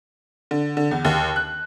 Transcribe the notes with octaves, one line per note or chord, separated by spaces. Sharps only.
D3
D3
E2
D#2
F#6